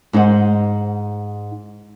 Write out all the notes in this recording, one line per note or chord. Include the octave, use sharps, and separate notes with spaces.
G#2 D#4 C5 F#5